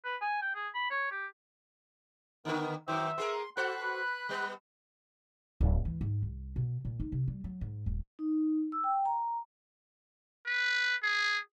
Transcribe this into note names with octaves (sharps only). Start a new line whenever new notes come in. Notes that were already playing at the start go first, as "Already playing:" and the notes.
B4
G#5
G5
G#4
B5
C#5
G4
D3 D#3 B3 A#4 B4
F#2 D#3 C5 E5 G5 D6
B3 G#4 A#4 C6
F#4 A4 C5 F#5 B5 F#6
B4
G3 B3 B4
D1
E3
G#2
C2
B2
A#2
D#4
C3
G3
F#3
G#2
D#1
D#4
E6
G5
A#5
B4
G#4